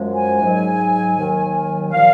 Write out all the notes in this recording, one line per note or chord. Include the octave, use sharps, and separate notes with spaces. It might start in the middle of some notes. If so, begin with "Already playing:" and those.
Already playing: F#2 F3 G#3
G#5
G#2 F#3
D#2 D#3 F#3
A#2 F3 F5